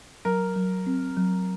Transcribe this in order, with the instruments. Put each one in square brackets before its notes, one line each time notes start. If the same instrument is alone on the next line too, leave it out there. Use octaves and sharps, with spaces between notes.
[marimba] F#3 [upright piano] A#4
[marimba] F#3
C4
F#3